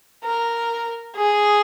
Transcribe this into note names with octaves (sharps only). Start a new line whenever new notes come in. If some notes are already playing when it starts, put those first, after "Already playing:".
A#4
G#4